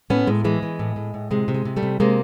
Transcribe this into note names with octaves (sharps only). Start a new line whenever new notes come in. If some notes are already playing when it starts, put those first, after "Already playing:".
A2 B3 C#4
A2 G#3
E3 G#3
E3
A2
A2
A2
C3 G#3
C3
G#3
C3
G3 A3
C3
C3 G#3 A#3